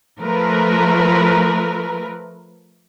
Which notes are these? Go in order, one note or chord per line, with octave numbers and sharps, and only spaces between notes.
F3 A3 A#4 B4